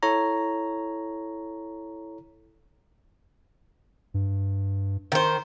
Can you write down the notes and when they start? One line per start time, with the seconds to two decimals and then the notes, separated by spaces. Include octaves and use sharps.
0.03 E4 A4 C#5 A#5
4.14 G2
5.12 D#3 C5